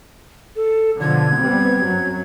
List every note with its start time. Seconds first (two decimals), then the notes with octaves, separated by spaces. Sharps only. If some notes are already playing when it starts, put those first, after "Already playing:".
0.56 A4
1.00 B2 D3 F3 G#6
1.38 G3 B3 C4
1.85 F#2 F#3